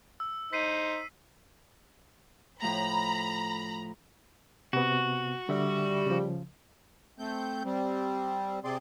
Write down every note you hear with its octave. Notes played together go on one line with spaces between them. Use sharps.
E6
D#4 C5 B6 C7 D#7
A2 F3 A3 A#5 B5
C3 B3 F#4
D3 G3 E5
C#3 F3
A3 C4 G6
G3 C4
C3 C4 G#4 D5 C6